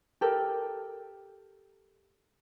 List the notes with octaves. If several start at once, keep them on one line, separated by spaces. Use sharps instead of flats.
G4 A4 A#4